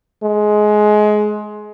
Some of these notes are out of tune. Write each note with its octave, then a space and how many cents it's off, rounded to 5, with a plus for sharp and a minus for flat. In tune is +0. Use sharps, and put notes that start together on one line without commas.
G#3 +20